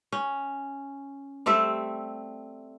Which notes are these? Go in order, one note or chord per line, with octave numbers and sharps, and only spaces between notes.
C#4
G3 A3 C4 E5